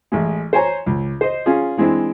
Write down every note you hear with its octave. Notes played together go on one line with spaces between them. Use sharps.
A1 G#3
C5 C#5 G#5 A#5
C#2
C5 D#5
C#4 F4 G#4
E3 G#3 C4 D4 E4